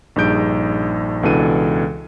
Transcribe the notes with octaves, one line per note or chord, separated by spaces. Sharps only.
A#1 G2 D#4 G#4 G6 D7
C#2 B2 E3 D4 A4 D#7